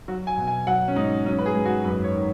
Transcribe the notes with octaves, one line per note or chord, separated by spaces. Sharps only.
F#3 F#4
G#5
B2
G#5
F#3 F#5
C#4
G#2 D#4
F#3 C#4
B4
G#4
G#2
F#4
F#2 B4
C#5
D#3